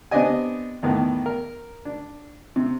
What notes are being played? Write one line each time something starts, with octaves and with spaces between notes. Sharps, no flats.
B3 C4 D4 G4 D#5 G#5
E2 A2 D#3 B3
A#4
D4
C3